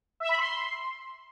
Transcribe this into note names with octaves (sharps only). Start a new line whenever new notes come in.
E5
B5
C6